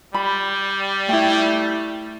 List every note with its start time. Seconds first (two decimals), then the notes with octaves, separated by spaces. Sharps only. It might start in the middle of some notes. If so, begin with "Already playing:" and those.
0.14 G3 B5
1.09 A3 E4 G5